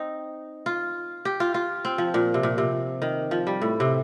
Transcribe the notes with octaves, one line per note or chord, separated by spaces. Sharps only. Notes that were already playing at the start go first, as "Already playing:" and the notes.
Already playing: C4 D#4
F4
G4
F4
F4
C4
F3
A#2
C3
A#2
C3
D#3
F3
G3
A2
C3